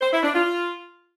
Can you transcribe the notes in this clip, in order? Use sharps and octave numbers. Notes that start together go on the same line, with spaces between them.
C5
E4
D4
F4